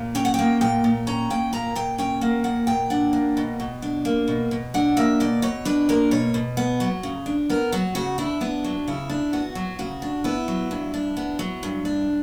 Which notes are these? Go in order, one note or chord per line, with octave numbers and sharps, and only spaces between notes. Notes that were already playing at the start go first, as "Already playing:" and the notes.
Already playing: A#2
C#4 G5
F#5
A#3 G5
A#2 G5
A#2
C#4 A#5
A#3 G5
A#2 A#5
A#2 G5
C#4 G5
A#3 F#5
A#2 F#5
A#2 G5
D4 F#5
A#3
B2
B2
D4
A#3
B2
B2
D4 F#5
A#3 E5
B2 D5
B2 C#5
D4 B4
A#3 A#4
B2 C#5
B2
B3
F#3
C#3
D4
B3 A#4
F#3 F#4
C#3 F#4
D4 E4
B3 D4
F#3
C#3 E4
D4
B3 F#4
F#3
C#3 F#4
D4
B3 E4
F#3
G2
D4
B3
F#3
G2
D4